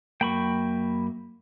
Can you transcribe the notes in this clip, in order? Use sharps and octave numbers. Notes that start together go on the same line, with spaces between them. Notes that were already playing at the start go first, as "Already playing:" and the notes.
F#2 F#3 A#3 G5 B5 C#6